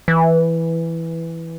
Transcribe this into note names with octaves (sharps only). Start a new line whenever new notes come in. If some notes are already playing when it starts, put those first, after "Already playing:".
E3